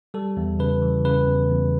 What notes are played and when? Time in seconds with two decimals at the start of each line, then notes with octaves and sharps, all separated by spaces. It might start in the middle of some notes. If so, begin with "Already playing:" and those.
0.14 G3 A4
0.37 E2
0.59 C#3 B4
0.82 E3
1.05 C#3 B4
1.27 E2
1.50 E2